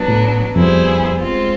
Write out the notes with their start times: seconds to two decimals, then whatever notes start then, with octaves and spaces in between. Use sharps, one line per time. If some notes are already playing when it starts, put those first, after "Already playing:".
Already playing: F#3 B3 D4
0.08 A2
0.56 F2 G3 B3 E4 G#4 C5
1.19 G#3 C4 F4